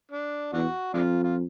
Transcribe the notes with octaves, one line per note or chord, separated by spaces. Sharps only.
D4
E2 D4 F#4
F2 G#3 D4 F4
F4